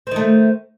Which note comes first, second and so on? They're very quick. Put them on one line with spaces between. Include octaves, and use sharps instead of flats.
C4 D#3 A3